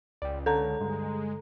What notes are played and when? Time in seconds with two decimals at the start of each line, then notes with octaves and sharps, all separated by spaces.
0.22 C#2 D5 G5
0.46 D3 A4 C#5 A5 A#5
0.80 G2 D3 G#3